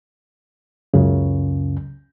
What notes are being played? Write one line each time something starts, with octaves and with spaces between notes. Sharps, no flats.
C#2 F#2 C#3